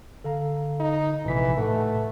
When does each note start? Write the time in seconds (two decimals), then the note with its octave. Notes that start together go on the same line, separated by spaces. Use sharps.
0.24 D3 A4 F5 A#5
0.80 D#4
1.26 A#1 C3 E3 B6
1.57 A2 A3 B4 F#5